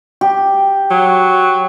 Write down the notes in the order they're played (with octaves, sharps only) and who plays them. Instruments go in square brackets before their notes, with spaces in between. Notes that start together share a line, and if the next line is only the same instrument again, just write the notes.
[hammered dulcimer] G4
[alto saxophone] F#3